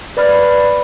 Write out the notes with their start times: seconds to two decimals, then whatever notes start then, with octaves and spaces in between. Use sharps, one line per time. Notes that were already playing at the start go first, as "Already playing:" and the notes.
0.17 B4 D5 B5 F6